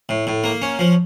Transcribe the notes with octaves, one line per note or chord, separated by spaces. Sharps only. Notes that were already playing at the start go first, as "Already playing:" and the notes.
A2
A2
A#3
C#4
F3